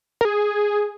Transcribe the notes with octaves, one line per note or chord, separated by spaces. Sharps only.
A#4
G#4